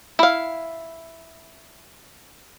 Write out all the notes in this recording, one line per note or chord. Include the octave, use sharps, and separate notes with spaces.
E4 F5